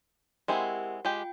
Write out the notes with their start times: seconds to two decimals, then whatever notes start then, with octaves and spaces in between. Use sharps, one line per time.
0.48 G#3 C4 E4 G4 A#4 F#5
1.05 G#3 F4 G4 G5